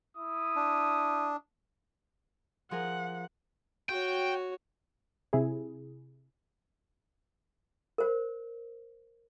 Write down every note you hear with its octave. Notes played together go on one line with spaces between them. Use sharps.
E4 D#6
D4
F3 G#4 A#4 F#5
F#4 C#5 G5
C3 E4 G#4
A#4 C5